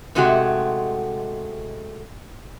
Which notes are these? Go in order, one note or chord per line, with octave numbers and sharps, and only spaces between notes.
G#2 C3 G#3 A3 F#4 G4